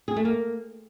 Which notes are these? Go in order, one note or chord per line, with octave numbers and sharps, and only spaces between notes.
G#4
A3
A#3